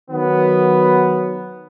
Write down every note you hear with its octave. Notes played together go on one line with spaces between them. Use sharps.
D#3 F#3 B3